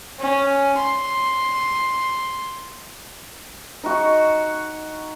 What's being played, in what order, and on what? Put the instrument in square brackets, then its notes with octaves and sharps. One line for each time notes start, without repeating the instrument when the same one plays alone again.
[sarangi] C#4
C6
[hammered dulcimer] D#4 F#4 C#6